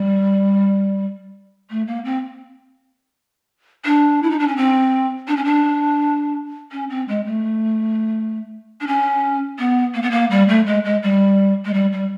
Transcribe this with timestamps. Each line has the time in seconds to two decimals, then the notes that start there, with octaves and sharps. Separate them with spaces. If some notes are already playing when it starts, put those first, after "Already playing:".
Already playing: G3
1.70 A3
1.87 A#3
2.05 C4
3.85 D4
4.23 E4
4.30 D#4
4.39 D4
4.48 C#4
4.57 C4
5.28 D4
5.37 C#4
5.45 D4
6.72 C#4
6.90 C4
7.08 G#3
7.26 A3
8.81 D4
8.87 C#4
9.59 B3
9.94 A#3
10.02 B3
10.11 A#3
10.31 G3
10.48 A3
10.67 G#3
10.84 G#3
11.03 G3
11.65 G#3
11.74 G3
11.92 G3